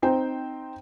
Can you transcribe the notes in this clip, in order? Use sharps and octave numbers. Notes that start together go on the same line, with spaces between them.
C4 D#4 C5 G5